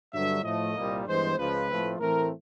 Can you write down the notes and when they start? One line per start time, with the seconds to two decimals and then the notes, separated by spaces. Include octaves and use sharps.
0.12 G2 D3 F#3 E5
0.43 A2 F3 A3 D#5
0.74 C2 A#2 G3 A#3
1.06 G2 E3 G#3 B3 C5
1.37 C#2 C#3 F3 B4
1.69 A2 F3 A3 C4
1.99 A2 E3 A3 C4 A#4